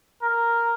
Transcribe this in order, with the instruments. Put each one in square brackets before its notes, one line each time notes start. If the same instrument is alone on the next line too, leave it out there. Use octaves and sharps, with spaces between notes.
[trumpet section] A#4